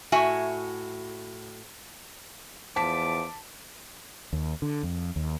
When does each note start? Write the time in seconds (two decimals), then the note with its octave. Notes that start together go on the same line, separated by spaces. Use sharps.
0.12 A2 F#4 E5 G#5
2.76 E2 F3 A5 D6 B6
4.33 D#2
4.62 D3
4.83 F2
5.16 D#2